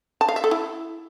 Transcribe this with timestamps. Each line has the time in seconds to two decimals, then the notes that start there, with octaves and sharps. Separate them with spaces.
0.21 A5
0.29 F5
0.36 E5
0.44 A4
0.51 E4